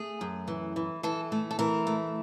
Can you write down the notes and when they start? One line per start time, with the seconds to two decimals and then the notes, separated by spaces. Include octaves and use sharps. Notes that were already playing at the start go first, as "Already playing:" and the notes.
Already playing: A3 G#4
0.21 F#2
0.48 E3
0.76 E3
1.03 E3 A4
1.32 A3
1.51 A4
1.59 E3 A#4
1.87 A3